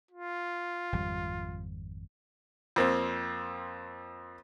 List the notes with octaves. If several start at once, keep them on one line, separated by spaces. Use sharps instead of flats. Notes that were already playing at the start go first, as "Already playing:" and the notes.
F4
G#1 F2 G3
F2 A#3 C4